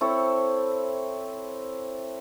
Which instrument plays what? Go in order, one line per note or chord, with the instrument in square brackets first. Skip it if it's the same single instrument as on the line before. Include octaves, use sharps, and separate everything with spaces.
[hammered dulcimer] C4 E4 A4 C#5